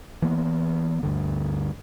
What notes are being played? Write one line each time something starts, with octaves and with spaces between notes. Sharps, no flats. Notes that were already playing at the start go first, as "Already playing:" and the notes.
E3 A#3 B3
D2 G2 D3